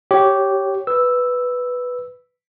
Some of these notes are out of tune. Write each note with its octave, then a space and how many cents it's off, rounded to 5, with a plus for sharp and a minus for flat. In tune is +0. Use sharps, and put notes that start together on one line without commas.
G4 -10 C#5 -5
B4 +0 E6 +0